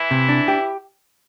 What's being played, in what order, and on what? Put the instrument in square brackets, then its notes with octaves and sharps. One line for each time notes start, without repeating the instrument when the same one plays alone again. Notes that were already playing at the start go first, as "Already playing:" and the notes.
Already playing: [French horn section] E3 E4
[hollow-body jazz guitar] C3
D4
G4